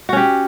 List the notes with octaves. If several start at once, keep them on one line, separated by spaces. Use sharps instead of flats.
C#4 F#4 G4